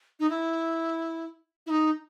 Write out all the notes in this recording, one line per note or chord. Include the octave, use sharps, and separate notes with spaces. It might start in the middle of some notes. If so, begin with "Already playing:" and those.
D#4
E4
E4
D#4